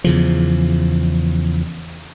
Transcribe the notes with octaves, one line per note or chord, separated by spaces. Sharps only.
E2 C#3 F3